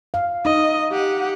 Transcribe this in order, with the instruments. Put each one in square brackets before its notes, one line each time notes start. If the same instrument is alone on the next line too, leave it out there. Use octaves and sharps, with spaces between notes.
[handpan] F5
[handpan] D#4 [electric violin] D#5
[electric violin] G4 F#5